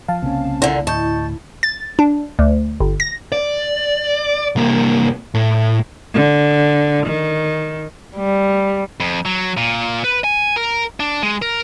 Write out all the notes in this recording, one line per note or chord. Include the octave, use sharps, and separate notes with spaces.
F3 F5 A5
C2 C#3 A#3 C4 C#4
A#2 D3 E4
D2 A2 D#5 A5 C#6 G6
A6
D4
D2
G1
A#6
D5
C2 A#3
A2
D3
D#3
G3
F2
F#3
A#2
B4
G#5
A#4
D4
G#3
A#4